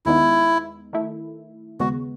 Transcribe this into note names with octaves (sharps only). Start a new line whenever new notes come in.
D#2 D#3 G#3 B3 D#4 E4
D#3 A3 E4
D#2 C#3 G#3 B3 F#4